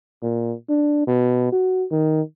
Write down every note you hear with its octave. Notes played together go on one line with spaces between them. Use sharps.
A#2
D4
B2
F#4
D#3